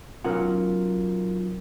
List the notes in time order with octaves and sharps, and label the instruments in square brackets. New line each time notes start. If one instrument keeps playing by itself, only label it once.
[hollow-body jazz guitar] B1 C#4 F#5 [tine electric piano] F4 A#4